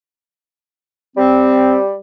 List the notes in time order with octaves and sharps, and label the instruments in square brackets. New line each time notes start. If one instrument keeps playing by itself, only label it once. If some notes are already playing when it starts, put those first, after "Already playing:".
[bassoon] G3 [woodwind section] C4